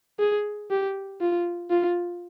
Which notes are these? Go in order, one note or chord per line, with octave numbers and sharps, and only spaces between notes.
G#4
G4
F4
F4